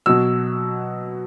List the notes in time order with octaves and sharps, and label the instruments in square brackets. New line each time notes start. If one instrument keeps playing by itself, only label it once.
[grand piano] B2 F#3 E6